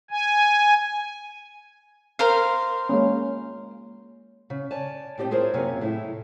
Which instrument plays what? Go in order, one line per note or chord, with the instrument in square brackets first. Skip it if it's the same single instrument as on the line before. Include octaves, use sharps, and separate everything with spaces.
[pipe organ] G#5
[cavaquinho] A#4 C5 F5
[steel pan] G#3 A#3 C#4
[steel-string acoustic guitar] C#3
C#5 D5 G#5 A5
A2 C4 G4 D5 D#5 G5
E4 F4 G#4 A#4 C5 C#5
F#2 C3 A#3 G4 C#5 G#5
A2 E4 D#5